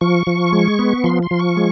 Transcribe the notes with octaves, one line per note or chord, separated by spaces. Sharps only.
F3 C#6
F3
G#3
B3
F3 C6
C6
F3
C#6
G#3